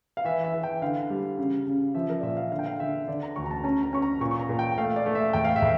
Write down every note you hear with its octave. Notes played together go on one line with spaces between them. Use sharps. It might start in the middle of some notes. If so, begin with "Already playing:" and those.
F5
E3 E5
E5
E3
G5
D3 F5
G3
C#3
C#3
F3 E5
A#4
D5
A#2 E5
F5
D3 F5
G5
F5
D3 E5
D3 D5
A#5
D2 C#6
A#5
A5
C#4 A#5
A#5
C#4 C#6
A#5
A#2 C#6
C#6
A#5
A#2
G5
A3 F5
D5
A3
E5
A2 G5
F5
E5
A2